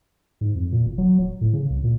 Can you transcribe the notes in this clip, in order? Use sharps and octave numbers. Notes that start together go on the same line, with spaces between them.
G#2
F2
A#2
F1
F#3
D#1
A2
C#3
C2
A#2